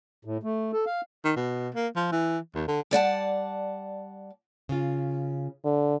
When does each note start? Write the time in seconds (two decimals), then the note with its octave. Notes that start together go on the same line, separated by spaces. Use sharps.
0.25 A2
0.43 A3
0.73 A4
0.86 F5
1.24 D#3
1.36 B2
1.74 A#3
1.96 F3
2.12 E3
2.55 D#2
2.68 D3
2.91 G3 D5 F#5 A5
4.69 C#3 F4
5.64 D3